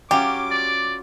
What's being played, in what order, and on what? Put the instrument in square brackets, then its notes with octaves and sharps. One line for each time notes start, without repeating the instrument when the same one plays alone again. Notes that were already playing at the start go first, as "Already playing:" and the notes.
[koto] F#3 C#4 F4 [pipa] G4 [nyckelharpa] D6
[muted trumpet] D5